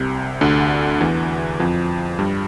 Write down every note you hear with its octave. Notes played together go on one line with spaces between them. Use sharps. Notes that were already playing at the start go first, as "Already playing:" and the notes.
Already playing: C2 C3
D2 D3
E2 E3
F2 F3
G2 G3